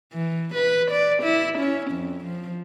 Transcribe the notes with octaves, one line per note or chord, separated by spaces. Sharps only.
E3
B4
D5
E4
C#4
F2
F3